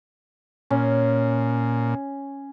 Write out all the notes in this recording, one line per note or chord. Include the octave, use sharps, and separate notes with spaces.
A#2 C#4